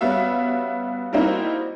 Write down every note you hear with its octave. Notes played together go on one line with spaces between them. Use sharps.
G3 B3 C#4 F#4 E5 F5
G3 A#3 C4 D#4 E4 F#4